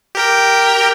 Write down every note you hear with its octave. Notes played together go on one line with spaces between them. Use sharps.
G4 A#4 G5